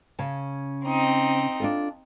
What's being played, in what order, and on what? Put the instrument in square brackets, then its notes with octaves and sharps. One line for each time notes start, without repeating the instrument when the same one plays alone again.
[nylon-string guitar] C#3 C#4 A5
[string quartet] C4 D#4
[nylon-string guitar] D4 F4 A4